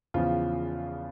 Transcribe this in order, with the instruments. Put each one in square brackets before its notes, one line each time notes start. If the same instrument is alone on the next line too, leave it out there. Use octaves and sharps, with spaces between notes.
[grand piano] E2 C#3 F3 F4